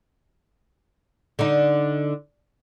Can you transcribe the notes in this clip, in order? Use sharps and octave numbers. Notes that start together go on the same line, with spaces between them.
D3 D#4